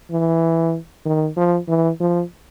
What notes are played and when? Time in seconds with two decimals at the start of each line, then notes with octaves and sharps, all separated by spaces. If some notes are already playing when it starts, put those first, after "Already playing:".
0.11 E3
1.06 D#3
1.36 F3
1.68 E3
2.00 F3